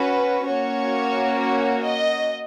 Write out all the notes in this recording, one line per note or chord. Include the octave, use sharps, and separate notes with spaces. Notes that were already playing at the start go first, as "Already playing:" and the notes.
Already playing: C#4 F#4 B4
A#3 C#4 F#4 C#5
C#5
D#5